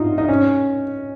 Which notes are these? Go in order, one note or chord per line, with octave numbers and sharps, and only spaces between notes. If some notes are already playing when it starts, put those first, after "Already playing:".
Already playing: D#4 F4
D#4
C#4